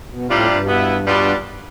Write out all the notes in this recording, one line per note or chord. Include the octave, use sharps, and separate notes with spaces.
B2
A2 C3 G3 D4 F4
G2
B2 B3 E4
B2 G3 B3 D4 F4